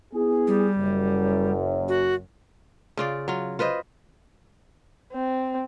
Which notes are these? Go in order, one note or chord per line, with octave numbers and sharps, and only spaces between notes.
B3 E4 G#4
G3
F#1 F#2
F#4
C#3 F4 D5
F#3 F4
F4 B4 C5 D#5
C4